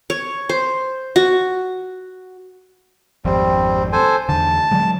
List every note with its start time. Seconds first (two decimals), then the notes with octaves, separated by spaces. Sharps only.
0.10 C#5
0.49 C5
1.16 F#4
3.25 G#1 F2 G3 C4
3.92 A4 C5 G#5
4.29 E2 D3 A5
4.71 D3 F#3 G#3